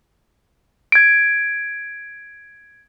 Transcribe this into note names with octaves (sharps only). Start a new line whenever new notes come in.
G#6 D7